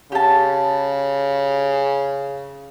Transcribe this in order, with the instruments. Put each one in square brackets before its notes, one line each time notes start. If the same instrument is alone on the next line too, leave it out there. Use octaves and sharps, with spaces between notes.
[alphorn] C#3 [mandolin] G4 A5